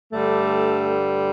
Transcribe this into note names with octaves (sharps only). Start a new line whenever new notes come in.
G2 D3 G3 A3